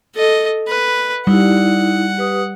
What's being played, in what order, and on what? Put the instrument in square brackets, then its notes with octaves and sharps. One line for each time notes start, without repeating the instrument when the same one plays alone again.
[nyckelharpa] A4 D#5
B4
[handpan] G3 [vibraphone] D#4 E4 [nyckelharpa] F#5
[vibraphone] G4 B4 D#6